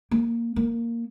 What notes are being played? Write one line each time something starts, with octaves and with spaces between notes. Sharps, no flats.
A#3
A#3